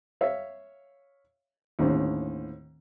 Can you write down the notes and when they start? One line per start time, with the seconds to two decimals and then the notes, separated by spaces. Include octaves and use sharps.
0.21 C#5 E5 F5
1.79 D#2 A2 D3 D#3 C4 C#4